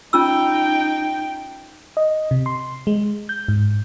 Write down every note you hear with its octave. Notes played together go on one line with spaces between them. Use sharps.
C#4 D#4 F4 G5 E6
D#5
C3
C6
G#3
G6
G#2